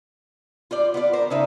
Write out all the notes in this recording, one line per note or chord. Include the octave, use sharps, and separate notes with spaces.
F4 C5 D5
B3 F4 D5
A#4 C5
C#3 D#4 E5